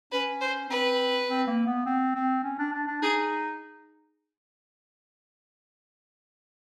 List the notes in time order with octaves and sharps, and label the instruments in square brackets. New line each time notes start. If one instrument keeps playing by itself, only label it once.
[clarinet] C#4 [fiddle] B4
[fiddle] C5
[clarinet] C4 [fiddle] B4
[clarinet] C4
A#3
B3
C4
C4
C#4
D4
D4
D4
[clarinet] D#4 [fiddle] G#4